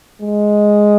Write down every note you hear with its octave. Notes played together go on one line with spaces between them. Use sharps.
G#3